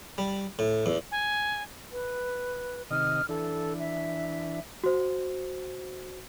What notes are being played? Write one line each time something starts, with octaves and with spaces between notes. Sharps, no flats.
G3
A2
E2
G#5
B4
C3 D#3 D#5 F6
E3 D4 A4
E5
F#4 C5